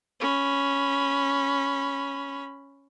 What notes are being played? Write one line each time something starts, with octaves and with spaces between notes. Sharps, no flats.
C#4 B5